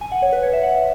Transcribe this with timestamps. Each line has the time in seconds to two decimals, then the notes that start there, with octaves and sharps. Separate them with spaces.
0.01 G#5
0.12 F#5
0.22 C#5
0.33 B4
0.43 C#5
0.53 E5
0.63 F#5
0.75 E5